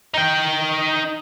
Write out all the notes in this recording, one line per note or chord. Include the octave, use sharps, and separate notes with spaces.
D#4 G5